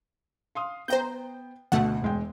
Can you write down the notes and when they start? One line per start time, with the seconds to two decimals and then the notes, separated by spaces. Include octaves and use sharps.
0.55 F5 C6 D#6
0.88 B3 C5 G5 A#5 G6
1.72 D2 B2 A3 F#5
2.02 E1 G#3 G5